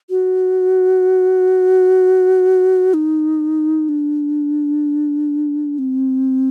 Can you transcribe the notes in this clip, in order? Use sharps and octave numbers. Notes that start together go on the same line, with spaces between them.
F#4
D#4
D4
C4